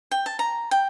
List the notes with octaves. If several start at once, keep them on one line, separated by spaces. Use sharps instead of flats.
G5
A5
A#5
G5